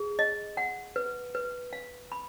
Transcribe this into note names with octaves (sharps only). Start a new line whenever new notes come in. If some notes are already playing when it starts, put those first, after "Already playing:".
Already playing: G#4
D#5
F#5
B4
B4
F5
B5